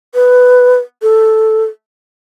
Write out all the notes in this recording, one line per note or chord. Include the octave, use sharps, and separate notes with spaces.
B4
A4